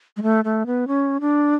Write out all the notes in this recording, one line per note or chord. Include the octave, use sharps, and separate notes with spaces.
G#3
A3
A3
B3
C#4
D4